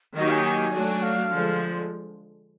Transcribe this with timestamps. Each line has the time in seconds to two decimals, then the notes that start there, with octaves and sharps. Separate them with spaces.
0.15 D#3 F#3 A#3 D#4 G4 D#5
0.30 G#5
0.45 G#5
0.73 F#3 A3 D4 F#4
1.02 F5
1.31 D3 F3 G#3